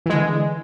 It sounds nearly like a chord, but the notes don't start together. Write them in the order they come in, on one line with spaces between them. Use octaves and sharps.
E3 G#3 D3